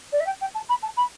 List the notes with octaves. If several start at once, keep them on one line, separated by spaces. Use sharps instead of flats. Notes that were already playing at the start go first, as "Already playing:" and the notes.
D5
E5
G5
G5
A5
B5
A5
B5